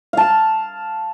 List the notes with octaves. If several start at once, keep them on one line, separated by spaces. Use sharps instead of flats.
F5 A5